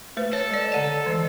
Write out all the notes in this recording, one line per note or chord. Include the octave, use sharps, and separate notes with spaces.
A3 B4 C5
A4 C#5
G#3 D5
D3 F#5 A5
E3 G#3